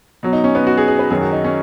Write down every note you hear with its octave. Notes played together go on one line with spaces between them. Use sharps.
B2 F#3
D#4
C#4
B3
F#4
G#4
G#4
B4
F#2 D#3 F#3 G#4
F#4
D#4
C#4